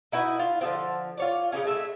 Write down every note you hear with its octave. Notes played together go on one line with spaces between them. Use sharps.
D#4 E4 F#4 B4
F4
D3 F3 C4
F4 C#5 D5
C#3 F#3 C#4
G#3 A3 D4 E5